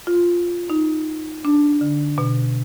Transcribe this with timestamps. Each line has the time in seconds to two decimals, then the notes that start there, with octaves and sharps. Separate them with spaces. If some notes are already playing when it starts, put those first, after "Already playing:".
0.07 F4
0.70 D#4
1.45 D4
1.81 D3
2.18 B2